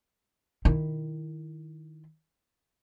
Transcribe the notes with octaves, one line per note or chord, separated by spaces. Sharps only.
D#3 E4